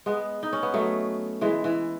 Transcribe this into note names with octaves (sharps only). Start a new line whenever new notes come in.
G#3 B3
D#4
C#4
B3
F#3 A3
E3 G#3
E3